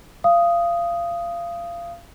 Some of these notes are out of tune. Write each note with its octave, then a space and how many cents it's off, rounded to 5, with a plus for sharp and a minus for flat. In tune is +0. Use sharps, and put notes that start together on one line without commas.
F5 -25 D#6 +0